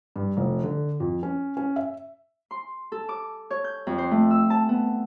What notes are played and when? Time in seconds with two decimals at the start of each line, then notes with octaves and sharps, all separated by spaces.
0.16 G2
0.37 F1
0.63 D3
1.00 F2
1.23 C#4
1.57 C#4
1.76 E5
2.51 C6
2.92 A4
3.09 D6
3.50 C#5
3.64 G6
3.87 F2
3.98 C5
4.11 A3
4.31 E6
4.50 A5
4.69 B3